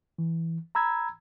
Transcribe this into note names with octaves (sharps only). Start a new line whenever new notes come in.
E3
A#5 B5 E6 G#6